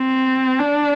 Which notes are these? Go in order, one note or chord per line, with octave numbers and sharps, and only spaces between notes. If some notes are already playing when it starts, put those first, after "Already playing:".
Already playing: C4
D4